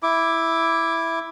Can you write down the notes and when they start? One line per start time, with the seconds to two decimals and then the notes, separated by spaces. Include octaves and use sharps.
0.03 E4 D6